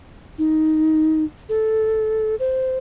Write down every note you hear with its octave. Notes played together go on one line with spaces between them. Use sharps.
D#4
A4
C5